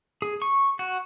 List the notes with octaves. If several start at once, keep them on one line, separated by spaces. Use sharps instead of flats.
G#4
C#6
F#4